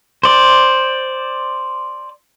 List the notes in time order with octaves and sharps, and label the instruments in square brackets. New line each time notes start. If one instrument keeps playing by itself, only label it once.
[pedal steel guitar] C5 D5